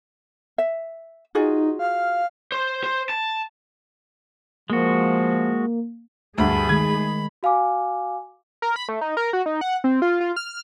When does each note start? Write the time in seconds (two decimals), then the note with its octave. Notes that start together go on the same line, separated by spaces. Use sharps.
0.58 E5
1.35 D#4 F4 F#4 G#4
1.79 F5
2.52 C5
2.84 C5
3.10 A5
4.70 F3 G#3 A#3 F#4
6.38 D2 G2 A3 G#4 B5
6.69 D#3 G#3 G#6
7.43 F#4 F5 G#5 D6
8.62 A#4
8.76 B5
8.89 A3
9.01 D#4
9.17 A#4
9.33 F#4
9.46 D#4
9.61 F#5
9.84 C4
10.02 F4
10.20 F4
10.36 F6